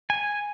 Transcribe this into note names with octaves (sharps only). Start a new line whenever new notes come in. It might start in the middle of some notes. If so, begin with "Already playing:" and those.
G#5